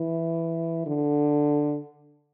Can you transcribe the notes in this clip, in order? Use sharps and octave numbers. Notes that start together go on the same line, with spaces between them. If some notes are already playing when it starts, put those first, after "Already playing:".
Already playing: E3
D3